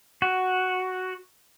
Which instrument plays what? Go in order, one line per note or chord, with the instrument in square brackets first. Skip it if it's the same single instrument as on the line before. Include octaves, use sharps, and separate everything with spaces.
[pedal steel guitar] F#4